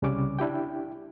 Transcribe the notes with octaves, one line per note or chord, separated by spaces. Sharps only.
C2 C#3 G3 C#4 D6
D4 E4 G4 G5